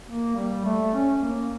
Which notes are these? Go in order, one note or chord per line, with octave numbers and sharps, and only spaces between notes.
A#3
G3
A3
C#4
A#3